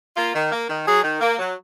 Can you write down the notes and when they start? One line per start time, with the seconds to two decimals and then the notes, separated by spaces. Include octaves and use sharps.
0.17 A#3 F4
0.35 D#3
0.52 A#3
0.69 D#3
0.86 F#3 G#4
1.03 D#3
1.20 A#3
1.38 F#3